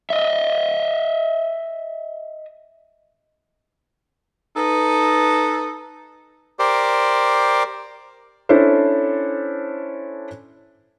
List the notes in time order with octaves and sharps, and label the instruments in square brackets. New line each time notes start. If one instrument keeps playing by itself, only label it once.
[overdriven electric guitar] D#5 E5
[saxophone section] D#4 A4 B4
[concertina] G4 A#4 C5 D5
[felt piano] C#4 D4 E4 A4 C5